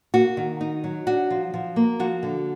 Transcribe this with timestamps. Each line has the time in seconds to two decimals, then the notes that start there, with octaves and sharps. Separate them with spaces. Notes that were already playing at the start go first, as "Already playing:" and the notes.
0.14 A#3 F#4
0.37 D#3
0.61 D#4
0.84 F#3
1.07 D4 F#4
1.30 F3
1.54 F3
1.76 A#3
1.99 F3 F#4
2.23 D3